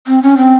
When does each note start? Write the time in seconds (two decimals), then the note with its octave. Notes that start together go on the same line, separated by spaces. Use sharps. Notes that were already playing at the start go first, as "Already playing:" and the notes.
0.07 C4
0.22 C#4
0.37 C4